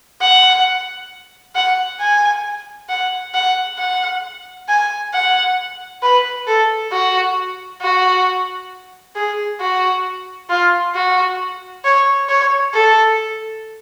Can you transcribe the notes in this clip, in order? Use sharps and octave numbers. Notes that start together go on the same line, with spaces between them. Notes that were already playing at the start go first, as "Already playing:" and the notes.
F#5
F#5
G#5
F#5
F#5
F#5
G#5
F#5
B4
A4
F#4
F#4
G#4
F#4
F4
F#4
C#5
C#5
A4